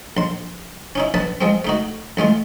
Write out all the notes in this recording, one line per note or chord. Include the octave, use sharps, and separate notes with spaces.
A#1 C6
C#4 D#4 E4
A#1 B4 A5 D#6
F3 G#3 C4
A3 D#4 F#4
A1 G#3 A3 F4